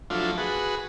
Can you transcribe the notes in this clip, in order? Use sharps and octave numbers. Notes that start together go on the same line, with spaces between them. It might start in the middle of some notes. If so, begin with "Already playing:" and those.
F3 F#3 A3 D4 E4 F4
F#4 G#4 B4